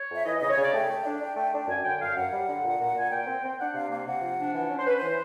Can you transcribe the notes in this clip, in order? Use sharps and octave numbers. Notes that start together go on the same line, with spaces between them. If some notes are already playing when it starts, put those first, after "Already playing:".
Already playing: C#5
F2 E5
E3 D#5
C#3 D#5
C#5
C#3 D5
A3 G5
A3
D4
D4
A3
D4
F#2 G#5
D3 G5
F#2 F5
F#2 F#5
G3
D3
A#2
A#2
A#2 G#5
A#2 G5
C4
C4
D4 F#5
C3 F5
A#3 F5
C3 F#5
F3
D4
E3 F#5
C#4
C5
C#4 B4
E3 C5